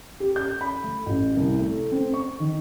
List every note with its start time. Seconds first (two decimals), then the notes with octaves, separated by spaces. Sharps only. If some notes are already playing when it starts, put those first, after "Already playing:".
0.20 G4
0.36 G6
0.61 B5
0.84 A3
1.06 A1
1.37 C2
1.59 A3
1.92 C4
2.14 C#6
2.40 D#3